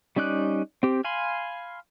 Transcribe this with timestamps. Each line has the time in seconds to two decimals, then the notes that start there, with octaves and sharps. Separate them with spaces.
0.16 G3 C#4 D#4 D5 F#6
0.83 C4 G4
1.04 F5 G#5 B5 C6